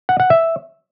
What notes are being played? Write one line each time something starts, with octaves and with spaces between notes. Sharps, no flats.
F#5
F#5
E5